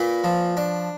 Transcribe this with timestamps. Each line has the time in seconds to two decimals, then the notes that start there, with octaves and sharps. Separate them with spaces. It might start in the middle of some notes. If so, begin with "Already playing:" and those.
Already playing: A#2 B4
0.24 F3
0.57 D4